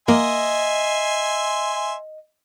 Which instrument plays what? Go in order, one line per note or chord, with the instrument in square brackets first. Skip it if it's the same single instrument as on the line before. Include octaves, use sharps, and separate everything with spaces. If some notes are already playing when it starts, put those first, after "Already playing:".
[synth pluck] A#3 [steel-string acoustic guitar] D#5 [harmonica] E5 G#5 C6